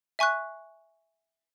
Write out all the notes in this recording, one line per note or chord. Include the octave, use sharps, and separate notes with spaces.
E5 G#5 C#6 F#6